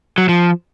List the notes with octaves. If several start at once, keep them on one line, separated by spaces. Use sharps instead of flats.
F#3
F3